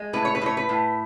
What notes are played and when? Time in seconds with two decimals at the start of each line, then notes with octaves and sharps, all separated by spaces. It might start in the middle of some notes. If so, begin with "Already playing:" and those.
Already playing: G#3
0.13 A2 B4
0.25 C#5
0.35 B4
0.42 A2 C#5
0.57 B4
0.69 A2